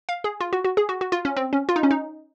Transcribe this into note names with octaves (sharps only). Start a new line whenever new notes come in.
F5
G#4
F4
F#4
F#4
G#4
F#4
F#4
F4
C#4
C4
C#4
F4
D#4
C#4
D#4